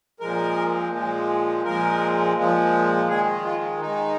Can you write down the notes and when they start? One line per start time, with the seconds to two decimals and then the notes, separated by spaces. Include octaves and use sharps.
0.20 A#2 F3 G#3 A#4
0.92 A#2 F3 G#3
1.65 A#2 F3 G#3 A#4
2.36 A#2 F3 G#3
3.09 D#3 G#3 G#4
3.45 F4
3.81 D#3 G#3 D#4